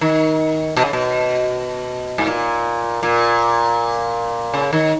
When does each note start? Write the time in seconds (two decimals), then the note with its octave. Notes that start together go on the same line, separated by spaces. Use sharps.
0.01 D#3
0.76 B2
0.85 C#3
0.93 B2
2.18 G#2
2.27 A#2
3.03 A#2
4.54 C#3
4.73 D#3